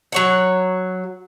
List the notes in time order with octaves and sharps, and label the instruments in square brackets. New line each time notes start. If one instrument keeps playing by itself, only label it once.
[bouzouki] F#3 C#5 F#5